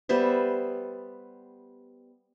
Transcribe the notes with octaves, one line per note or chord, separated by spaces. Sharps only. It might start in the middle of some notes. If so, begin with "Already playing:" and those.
G3 B3 C5 E5